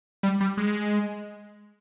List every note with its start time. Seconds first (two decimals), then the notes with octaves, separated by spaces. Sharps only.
0.23 G3
0.41 G3
0.57 G#3